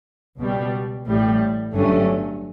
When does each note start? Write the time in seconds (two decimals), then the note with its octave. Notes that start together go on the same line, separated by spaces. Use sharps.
0.39 C#2 B2 G3
1.06 A1 A2 G3
1.73 G1 G2 F#3 A3 C#4